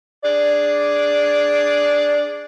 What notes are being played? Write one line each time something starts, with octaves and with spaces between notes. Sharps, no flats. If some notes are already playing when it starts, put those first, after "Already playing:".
D4 G#4 D5